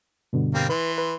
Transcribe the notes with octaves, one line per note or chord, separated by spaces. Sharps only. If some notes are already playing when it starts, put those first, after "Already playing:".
G2 B2 D3
G3 A#3 C4
E3 B4 C6
B4